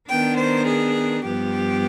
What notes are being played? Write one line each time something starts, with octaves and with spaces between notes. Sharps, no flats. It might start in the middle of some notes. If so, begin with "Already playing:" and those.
D#3 B3 D4 G5
C5
G#4
G2 F3 B3 G4